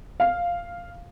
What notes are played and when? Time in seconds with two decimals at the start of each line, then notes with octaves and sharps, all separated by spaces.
0.20 F5